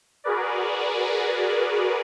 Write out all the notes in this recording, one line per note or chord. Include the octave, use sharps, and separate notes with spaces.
F#4 G#4 A#4 B4 D5